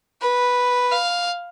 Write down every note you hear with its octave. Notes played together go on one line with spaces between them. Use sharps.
B4
F5